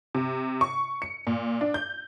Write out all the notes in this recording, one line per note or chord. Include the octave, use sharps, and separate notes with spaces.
C3
C#6
C#7
A#2
D4
G6